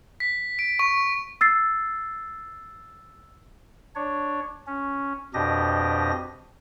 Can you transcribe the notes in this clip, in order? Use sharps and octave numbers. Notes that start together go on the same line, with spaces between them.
B6
D7
C#6
E6 A6 C7
D4 C#5
C#4
F2 B2 D4 G4 D#5 A#6